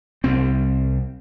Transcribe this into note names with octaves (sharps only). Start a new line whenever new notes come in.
C2 C4